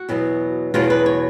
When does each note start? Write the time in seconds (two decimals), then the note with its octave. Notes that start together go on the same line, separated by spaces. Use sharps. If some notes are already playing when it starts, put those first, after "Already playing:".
Already playing: F#4
0.09 E2 B2 F#3 B3
0.74 E2 B2 F#3 B3 F4
0.90 B4
1.06 C#5